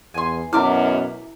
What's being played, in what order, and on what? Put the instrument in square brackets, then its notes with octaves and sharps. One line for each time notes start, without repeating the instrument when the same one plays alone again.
[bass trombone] E2 [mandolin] G#5 C6
[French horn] F#2 [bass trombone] B2 [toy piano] E4 G#5 A#5 [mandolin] E5 D6 F6